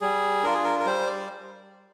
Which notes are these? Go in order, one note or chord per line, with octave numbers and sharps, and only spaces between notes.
G3 G#4
D4 F4 A#4
G#4
A#4
A#4
G3 C5
D5